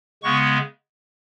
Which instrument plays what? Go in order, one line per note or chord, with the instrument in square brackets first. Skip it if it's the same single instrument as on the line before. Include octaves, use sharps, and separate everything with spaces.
[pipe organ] C#3 G#3 B3 C#6